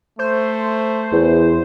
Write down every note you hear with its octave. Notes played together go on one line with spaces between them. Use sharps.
A3 C5
E2